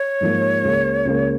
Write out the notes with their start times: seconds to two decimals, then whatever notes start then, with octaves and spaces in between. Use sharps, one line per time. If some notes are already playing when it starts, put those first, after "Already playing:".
Already playing: C#5
0.21 G#2 F3 A#3
0.64 C#2 C#3 A#3
1.05 C#2 C#3 A#3